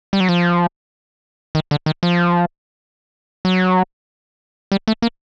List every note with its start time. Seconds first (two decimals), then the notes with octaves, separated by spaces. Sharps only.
0.13 G3
0.20 F#3
0.29 F3
1.55 D#3
1.71 D3
1.86 D#3
2.03 F3
3.45 F#3
4.72 G3
4.88 A3
5.02 A#3